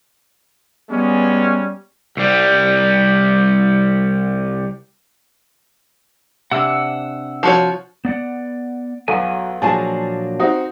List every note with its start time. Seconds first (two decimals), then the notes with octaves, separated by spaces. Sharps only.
0.90 G3 G#3 B3 C#4
2.17 C2 G3
6.51 C3 D4 F#5 E6
7.43 F3 F#4 C#5
8.05 B3 D5 F#5
9.08 B1 F#4 A4 C#5 F5 F#5 G#5
9.62 A#2 F3 F#3 A#3 D4 G#4 G#5 A5
10.40 C4 D#4 F#4